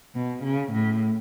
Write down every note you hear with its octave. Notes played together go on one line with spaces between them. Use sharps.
B2
C#3
A2